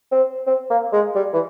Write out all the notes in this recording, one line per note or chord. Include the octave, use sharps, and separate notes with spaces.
C4
C4
A#3
G#3
G3
E3